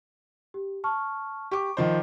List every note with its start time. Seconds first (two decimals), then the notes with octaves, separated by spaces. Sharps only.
0.54 G4
0.84 A5 C#6 F6
1.51 G4 C#6 D6
1.77 D#3 F3 C5 D#5